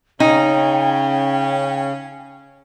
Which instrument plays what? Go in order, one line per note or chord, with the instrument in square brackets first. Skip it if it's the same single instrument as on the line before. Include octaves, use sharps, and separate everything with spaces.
[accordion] C#3 [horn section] C#4 [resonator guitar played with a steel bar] D#4 [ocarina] G5